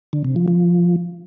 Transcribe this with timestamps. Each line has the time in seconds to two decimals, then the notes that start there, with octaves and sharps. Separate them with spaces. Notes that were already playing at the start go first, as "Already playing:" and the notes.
0.13 D3
0.25 C3
0.36 F3
0.48 F3